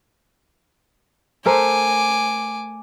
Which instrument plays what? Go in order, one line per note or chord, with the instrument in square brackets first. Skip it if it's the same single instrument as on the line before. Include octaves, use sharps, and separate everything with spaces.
[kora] A3 A#4 C5 [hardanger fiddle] G#5 D6